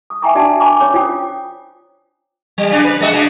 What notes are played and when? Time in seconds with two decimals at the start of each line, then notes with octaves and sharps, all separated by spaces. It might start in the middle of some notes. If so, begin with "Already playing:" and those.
0.10 D#6
0.22 E5 G5 G#5 A#5 C#6 D6
0.35 D4 F#4 D5 E5 G5 A5
0.60 D5 G#5 A#5 B5 C#6 D6
0.80 C#4 C#5 D6
0.94 F4 C5 G5 D#6
2.58 G3
2.71 C#3 C#4 D4
2.84 B4
3.01 G#3 F#4 D#5
3.12 C#3 D4